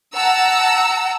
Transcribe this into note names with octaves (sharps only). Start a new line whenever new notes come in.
F#5 A5 A#5 E6